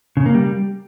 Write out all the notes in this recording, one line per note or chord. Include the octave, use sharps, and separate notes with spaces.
C#3
A#3
G3